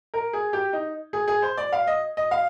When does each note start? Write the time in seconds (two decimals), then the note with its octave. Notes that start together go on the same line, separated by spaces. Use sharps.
0.14 A#4
0.33 G#4
0.53 G4
0.73 D#4
1.13 G#4
1.28 G#4
1.42 C5
1.58 D5
1.73 F5
1.87 D#5
2.17 D#5
2.31 F5